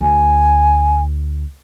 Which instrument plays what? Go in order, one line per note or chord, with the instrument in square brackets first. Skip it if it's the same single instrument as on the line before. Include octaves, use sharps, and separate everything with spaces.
[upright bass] D2 [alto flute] G#5